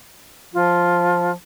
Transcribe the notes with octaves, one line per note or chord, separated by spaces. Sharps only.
F3 F4